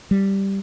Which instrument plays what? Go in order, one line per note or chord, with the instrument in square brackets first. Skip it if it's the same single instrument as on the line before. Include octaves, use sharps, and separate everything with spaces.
[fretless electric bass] G3